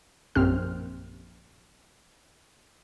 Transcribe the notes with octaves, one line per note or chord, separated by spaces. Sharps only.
A#1 F#2 C4 G4 F6